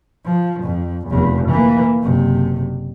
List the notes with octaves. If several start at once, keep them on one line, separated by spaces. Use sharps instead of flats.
F3
F2
F1 E2
E3 A#3
F#1 C3